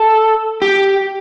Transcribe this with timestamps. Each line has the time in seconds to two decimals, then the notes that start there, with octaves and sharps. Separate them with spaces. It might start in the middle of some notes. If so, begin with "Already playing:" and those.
Already playing: A4
0.62 G4